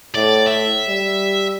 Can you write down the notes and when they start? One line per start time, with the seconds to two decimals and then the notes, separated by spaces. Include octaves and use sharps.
0.15 A2 D5
0.48 E5
0.88 G3